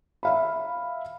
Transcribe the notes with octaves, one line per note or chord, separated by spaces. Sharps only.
E5 F5 B5